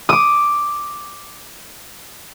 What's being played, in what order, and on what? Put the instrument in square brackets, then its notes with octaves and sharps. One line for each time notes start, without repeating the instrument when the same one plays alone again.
[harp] D6 D#6